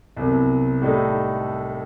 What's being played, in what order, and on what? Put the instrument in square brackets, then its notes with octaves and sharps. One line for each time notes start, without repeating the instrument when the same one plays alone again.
[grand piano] C2 C3 F#3 B3
A2 G3 D#4 A4